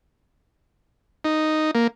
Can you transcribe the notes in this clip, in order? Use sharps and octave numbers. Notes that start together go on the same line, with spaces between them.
D#4
A#3